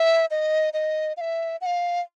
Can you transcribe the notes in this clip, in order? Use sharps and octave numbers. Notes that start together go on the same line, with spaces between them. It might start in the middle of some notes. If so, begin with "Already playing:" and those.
Already playing: E5
D#5
D#5
F5
E5
F#5
F5